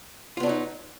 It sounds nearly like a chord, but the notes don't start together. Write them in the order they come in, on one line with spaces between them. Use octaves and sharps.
F4 B3 D4 F#3 D#4